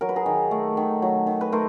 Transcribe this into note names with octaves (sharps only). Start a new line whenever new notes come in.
F#3 A#4
B4
G#4 A#4
D#3
A3
D#3
F#3
D#3
B4
A3 A#4 C5